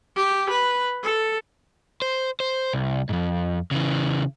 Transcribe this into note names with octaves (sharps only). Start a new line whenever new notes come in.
G4
B4
A4
C5
C5
C2
F2 G#2
C#3 E3